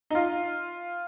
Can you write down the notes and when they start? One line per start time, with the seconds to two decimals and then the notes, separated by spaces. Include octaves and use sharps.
0.10 D#4
0.15 F4